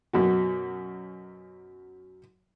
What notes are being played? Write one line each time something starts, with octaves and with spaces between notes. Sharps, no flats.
F#2 B2 F#4